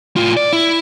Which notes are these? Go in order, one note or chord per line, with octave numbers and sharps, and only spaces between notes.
A2 F4
D5
E4